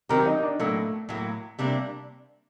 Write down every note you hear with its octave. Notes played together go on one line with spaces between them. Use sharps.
D#3 F#3 C4 G4 A#4 A#5
D#4 D#5
D4 D5
A2 F#3 A3 A#3 A4
A2 F#3 A#3
C3 G3 A#3 D4